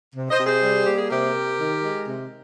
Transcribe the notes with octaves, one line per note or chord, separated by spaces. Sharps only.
C3
C5 D#5
C3
G#4 C5
G3
A#3 G4
G#4
C3 G4 A#4
C3
D#3
G#3
C3